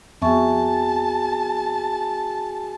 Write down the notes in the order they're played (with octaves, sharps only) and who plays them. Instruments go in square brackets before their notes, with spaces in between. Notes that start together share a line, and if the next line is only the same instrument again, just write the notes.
[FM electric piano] F2 [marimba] B3 E5 C#6 [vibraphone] F#4 G#4 G#5 [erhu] A5